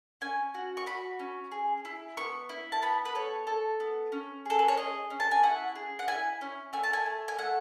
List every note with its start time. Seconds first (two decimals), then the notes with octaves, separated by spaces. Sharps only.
0.21 C#4 G#5
0.55 F#4
0.77 C#6
0.86 F#4 B5
1.19 C#4
1.52 G#4
1.85 E4
2.17 B3 C#6
2.49 E4
2.72 A5
2.82 B3 B5
3.05 B4
3.15 A4 C#5
3.47 A4
3.80 B3
4.12 C#4
4.45 G#4 A4
4.59 B4
4.68 C#5
4.77 G#4 D#5
5.10 C#4
5.20 A5
5.31 G#5
5.43 E4 F#5
5.75 G#4
5.99 F#5
6.08 E4 G#5
6.41 C#4
6.73 A3 G#5
6.83 A5
6.93 G#5
7.06 A3
7.28 G#5
7.38 A3 F#5